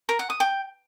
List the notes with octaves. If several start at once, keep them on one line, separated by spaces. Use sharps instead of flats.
A#4
F#5
D#6
G5